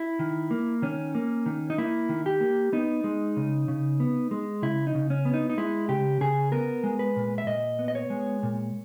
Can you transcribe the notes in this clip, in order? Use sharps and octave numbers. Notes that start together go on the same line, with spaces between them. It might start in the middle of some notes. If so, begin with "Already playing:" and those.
Already playing: E4
D#3
A#3
D#3 C#4
A#3
D#3
D#4
A#3 E4
D#3
G4
A#3
B3 D#4
G#3
C#3
C#3
B3
G#3
C#3 E4
D#4
C#3
C#4
B3
D#4
D#4
G#3 E4
C#3 G4
C#3 G#4
B3 A#4
G#3
B4
A#2
E5
A#2 D#5
B3
D#5
C#5
G#3
A#2